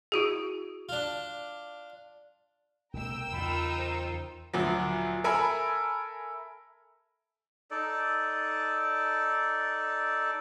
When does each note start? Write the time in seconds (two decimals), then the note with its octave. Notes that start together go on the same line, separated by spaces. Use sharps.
0.12 E4 F#4 G#4
0.89 D4 F4
2.93 C2 B2 A3 A#4 G5 E6
3.33 E2 C#3 D#4 F4 B5
3.78 C5
4.53 D2 A#2 F3 F#3
5.24 A4 A#4 E5 G#5 A#5 B5
7.71 D#4 A4 D5